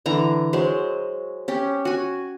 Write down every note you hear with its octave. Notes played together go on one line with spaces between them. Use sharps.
D3 E3 A#5
F#3 G#3 C5
C#4 G4
F#4 G#5